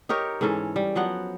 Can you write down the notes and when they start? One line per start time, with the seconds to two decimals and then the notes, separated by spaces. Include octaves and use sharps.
0.09 D#4 G4 A#4 C#5
0.41 G#2 E3 C#4 A4
0.76 G3
0.95 F3 F#3 B3 F#5